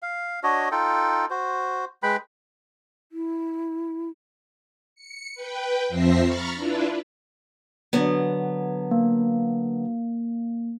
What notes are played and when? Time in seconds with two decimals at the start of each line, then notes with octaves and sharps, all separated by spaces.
0.02 F5
0.43 D4 F#4 C#5 D#5
0.71 D#4 F4 A4 G5
1.30 F#4 C5
2.03 G#3 B4 G5 B5
3.12 E4
4.95 C#7
5.34 B4 G5
5.89 F2 F3 C4 E5 A#6 C7
6.22 A#5 B5 C#6 F6 A6
6.54 D4 E4 F4 B4
7.93 D3 F#3 B3
8.91 A#3